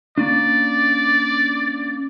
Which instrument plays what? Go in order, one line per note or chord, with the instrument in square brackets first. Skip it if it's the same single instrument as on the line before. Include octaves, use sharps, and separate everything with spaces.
[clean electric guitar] A#3 C#4 D4 [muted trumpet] D5